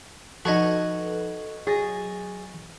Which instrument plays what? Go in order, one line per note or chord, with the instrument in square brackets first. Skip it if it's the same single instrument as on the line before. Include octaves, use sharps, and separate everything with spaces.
[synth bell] F3 D#4 [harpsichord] F#4 C#5 D#5 [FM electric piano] A4 B4
[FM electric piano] F#3 [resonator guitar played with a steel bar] G#4 [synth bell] C#6 A6 A#6